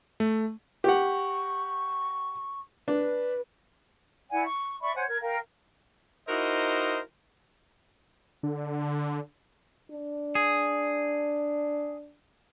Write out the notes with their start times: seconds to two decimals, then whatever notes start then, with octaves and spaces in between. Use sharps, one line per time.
0.20 A3
0.84 G4 F#5 C#6
2.88 D4 B4
4.31 E4 D5 F#5 G#5
4.45 C#6
4.81 D5 E5 B5 C#6
4.95 C5 C#5 F#5 G#5
5.07 A#4 G#6
5.22 A#4 F5 G5
6.28 D#4 E4 F#4 A#4 C5 D#5
8.43 D3
9.91 D4
10.35 G#4